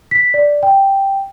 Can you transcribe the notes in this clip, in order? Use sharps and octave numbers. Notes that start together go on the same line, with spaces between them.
B6
D5
G5